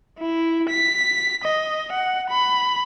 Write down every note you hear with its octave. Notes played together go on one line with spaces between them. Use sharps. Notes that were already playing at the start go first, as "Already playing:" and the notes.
E4
B6
D#5
F#5
B5